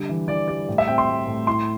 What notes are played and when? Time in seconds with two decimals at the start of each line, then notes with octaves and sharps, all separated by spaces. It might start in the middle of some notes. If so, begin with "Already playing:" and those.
Already playing: D3 G3
0.09 E3
0.28 E3 D5
0.48 G3 D5
0.68 A2
0.78 E5
0.88 C4 G5
0.98 C6
1.08 A3
1.27 A2
1.47 E4 C6